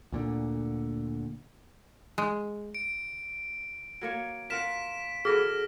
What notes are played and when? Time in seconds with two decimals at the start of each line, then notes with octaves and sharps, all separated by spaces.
0.12 D2 A#2 D3
2.18 G#3
2.75 D7
4.01 F#3 A#3 C#5
4.50 F4 A#4 F#5 B6 E7
5.25 D3 F#3 G#4 B4 F6 A#6